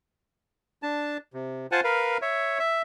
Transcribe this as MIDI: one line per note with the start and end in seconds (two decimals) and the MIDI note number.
0.83 1.17 62
0.83 1.17 81
1.34 1.67 48
1.72 1.81 65
1.72 1.81 72
1.72 1.81 78
1.72 1.81 80
1.72 1.81 81
1.84 2.18 70
1.84 2.18 71
1.84 2.18 77
2.22 2.59 73
2.22 2.59 76
2.59 2.82 76